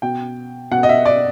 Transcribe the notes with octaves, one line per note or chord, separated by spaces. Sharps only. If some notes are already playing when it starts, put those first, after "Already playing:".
B2 G5
B2 F#5
D#5
E5
D5